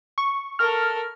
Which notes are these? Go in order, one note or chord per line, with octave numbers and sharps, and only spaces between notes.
C#6
A4 A#4 F6